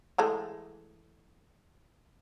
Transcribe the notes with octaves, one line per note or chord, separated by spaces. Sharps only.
E3 G#3 A3